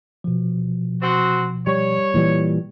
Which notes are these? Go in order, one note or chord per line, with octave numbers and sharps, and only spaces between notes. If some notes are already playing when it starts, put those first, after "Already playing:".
B2 F3
C4 F#4
G3 C#5
A#2 E3 G3